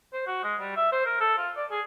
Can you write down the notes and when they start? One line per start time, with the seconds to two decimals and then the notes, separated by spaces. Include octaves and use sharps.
0.13 C5
0.27 F#4
0.43 G#3
0.60 G3
0.76 E5
0.92 C5
1.06 A#4
1.20 A4
1.38 F4
1.56 D5
1.71 G#4